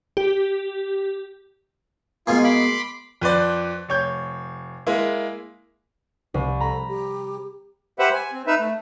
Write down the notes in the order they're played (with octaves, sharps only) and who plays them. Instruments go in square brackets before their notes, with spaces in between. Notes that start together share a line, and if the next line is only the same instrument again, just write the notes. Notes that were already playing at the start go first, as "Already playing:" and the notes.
[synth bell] G4
[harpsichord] B2 G#3 A#3 [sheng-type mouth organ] F4 G#5
[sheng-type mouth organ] B5 C6 D6
[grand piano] F2 B4 C5 D5
F1 C#5 G6
G#3 A#3 E4
[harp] C2
[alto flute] A4 [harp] A#5 B5
[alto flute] G4
[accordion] G4 B4 C5 E5 F#5
G#5
C4
D#4 B4 E5
A3